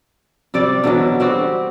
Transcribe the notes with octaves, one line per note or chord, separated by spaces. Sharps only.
C3 G3 D5
B2 D3 E3 F#3
G3 C4 F#4 G4